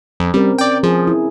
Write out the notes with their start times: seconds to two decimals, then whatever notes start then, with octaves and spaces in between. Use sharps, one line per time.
0.20 F2
0.34 G3 C4 C#4 A#4
0.58 D5 G5
0.83 F3 G#4
1.07 E4